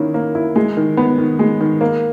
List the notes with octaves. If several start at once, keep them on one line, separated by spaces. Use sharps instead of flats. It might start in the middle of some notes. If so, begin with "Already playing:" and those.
Already playing: D#3 A#3 C#4 E4
A#3
E4
G#3
D#3
B3
D#3
G#3
D#3
A#3